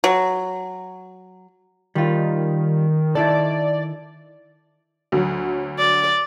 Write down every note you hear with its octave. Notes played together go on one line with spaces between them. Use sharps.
F#3
D#3 G3 F4
D#3 E4 A4 D5
D2 F#3
D5